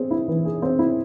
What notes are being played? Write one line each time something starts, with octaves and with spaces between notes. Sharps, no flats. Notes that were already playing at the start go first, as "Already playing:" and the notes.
Already playing: C4 G#4
E4
E3
G#4
C4
E4